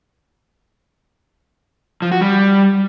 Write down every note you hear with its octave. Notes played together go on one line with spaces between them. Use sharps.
F3
F#4
G3